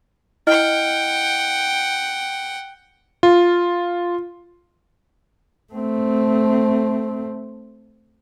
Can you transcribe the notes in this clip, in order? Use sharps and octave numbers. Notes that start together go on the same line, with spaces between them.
E4 D#5 F#5 G5 F6
F4
A3 C4